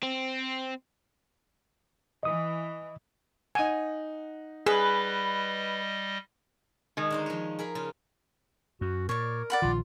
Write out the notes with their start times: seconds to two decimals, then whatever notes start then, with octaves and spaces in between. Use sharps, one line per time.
0.03 C4
2.23 E3 D#5 D#6
3.55 D#4 F#5 G#5
4.66 G3 G#4 B4 D#5
6.97 D#3 G#3
7.10 D3 D#4 C5
7.26 F3 C#5
7.59 G#4 A#4 B5
7.75 C#3 F4
8.81 F#2 F#4
9.09 A#2 A#4 C#5 D5
9.50 D5 F#5 B5
9.62 A#1 D#3 F4